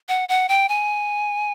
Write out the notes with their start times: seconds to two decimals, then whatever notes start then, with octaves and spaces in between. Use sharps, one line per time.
0.09 F#5
0.29 F#5
0.49 G5
0.69 G#5